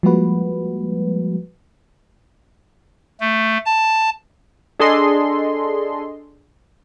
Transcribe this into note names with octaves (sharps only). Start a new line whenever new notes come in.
F3 G3 G#3 A#3 F#4 B4
A3
A5
D4 G#4 A4 D#5 C6